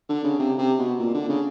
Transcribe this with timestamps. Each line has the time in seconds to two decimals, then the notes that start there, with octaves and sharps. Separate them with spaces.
0.09 D3
0.24 C#3
0.39 C3
0.59 C3
0.79 B2
0.99 A#2
1.14 D3
1.29 C#3